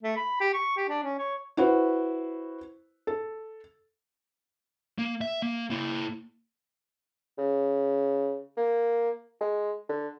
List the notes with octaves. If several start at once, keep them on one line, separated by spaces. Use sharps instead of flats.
A3
B5
G4
C#6
G4
D4
C#4
C#5
E4 F#4 B4 C5
A4
A#3
E5
A#3
A#3 E4
C#3
A#3
G#3
D3